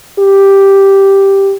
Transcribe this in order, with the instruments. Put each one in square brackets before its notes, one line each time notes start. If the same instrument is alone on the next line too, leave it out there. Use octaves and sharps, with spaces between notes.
[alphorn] G4